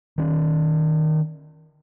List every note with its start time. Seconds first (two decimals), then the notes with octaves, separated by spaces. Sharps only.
0.18 D#3 C#4